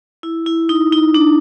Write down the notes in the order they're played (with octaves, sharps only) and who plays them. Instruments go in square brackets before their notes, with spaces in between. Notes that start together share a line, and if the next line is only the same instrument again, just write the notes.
[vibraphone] E4
E4
D#4
D#4
D4